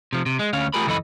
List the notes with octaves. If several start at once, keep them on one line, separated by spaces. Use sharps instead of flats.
C3 F3
C3
G#3
D2 C#4 F5
A3 F4 G4 G#4 A#4 B5
C#2 F#2 E3 A4 D#5 B5